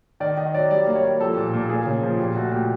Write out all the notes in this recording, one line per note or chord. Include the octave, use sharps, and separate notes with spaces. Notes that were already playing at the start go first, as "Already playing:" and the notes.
D#3 D5
D#3 D#5
F#3 D5
G3 D5
A#3
C#5
G3
F3 A4
A#2
A#2
A#3 G#4
C#3
F3
A#2 G4
A3 F#4
A#2 G4